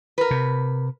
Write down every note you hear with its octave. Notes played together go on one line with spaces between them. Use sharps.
A#4 B4
C3